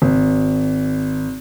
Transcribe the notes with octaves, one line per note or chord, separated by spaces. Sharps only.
G#1